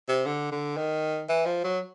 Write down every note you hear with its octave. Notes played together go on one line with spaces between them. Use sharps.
C3
D3
D3
D#3
E3
F3
F#3